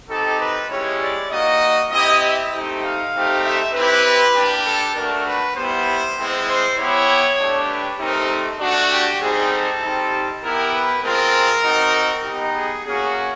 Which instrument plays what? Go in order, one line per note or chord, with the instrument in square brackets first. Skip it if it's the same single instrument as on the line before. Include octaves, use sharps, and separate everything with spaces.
[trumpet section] C4 D#4 G4 A4
B4
G#3 C#4 E4 G4 C#5
D5
A#3 D#4 F#4 D#5
C4 E4 G4 D#5
E5
A3 C4 D#4 G4 G5
F5
A3 C4 D#4 G4
E5
C4 E4 G4 B4
A#3 D4 G4
A4
A3 D4 F#4 A#4
B4
G3 B3 E4 G4 C5
G#3 C4 E4
C5
B3 E4 G4 C#5
A3 D4 G4
B4
A3 C4 D#4 G4 A#4
A3 D4 F#4
G4
G3 C4 D#4 G#4
A4
G3 C4 D#4 G4
B3 E4 G4 A#4
B4
G#3 C4 F4 A#4
C4 D#4 F#4
B3 D#4 G4
G#4
A#3 C#4 F#4 G#4